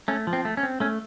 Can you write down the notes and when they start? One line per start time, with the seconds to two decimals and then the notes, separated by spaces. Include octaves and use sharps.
0.08 A3 C#4
0.27 F3
0.33 C4
0.45 A3
0.57 C#4
0.63 C4
0.80 A3 C#4